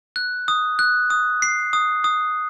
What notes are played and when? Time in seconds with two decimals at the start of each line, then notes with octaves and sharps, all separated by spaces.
0.16 F#6
0.48 D#6
0.79 F#6
1.10 D#6
1.42 C7
1.73 D#6
2.04 D#6